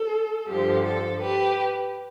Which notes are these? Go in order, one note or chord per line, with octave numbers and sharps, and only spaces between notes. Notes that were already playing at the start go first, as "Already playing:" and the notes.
Already playing: A4
G2 D3 F3 G4
A4
G4 B4